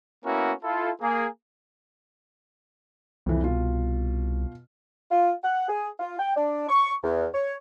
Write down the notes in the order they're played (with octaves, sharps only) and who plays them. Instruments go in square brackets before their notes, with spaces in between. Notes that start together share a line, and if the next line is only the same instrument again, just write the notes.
[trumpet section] A#3 B3 C#4 E4 F#4 A#4
E4 F4 A4
A#3 G#4
[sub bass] C2 [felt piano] F2 E3
[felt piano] B2 F4
[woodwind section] F4
F#5
G#4
F4
G5
D4
C#6
E2
C#5